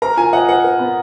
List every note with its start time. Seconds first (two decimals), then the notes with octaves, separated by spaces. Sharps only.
0.02 A#4 A#5
0.17 F4 G#5
0.33 D#5 F#5
0.49 A#4 F#5
0.64 A#4
0.79 B3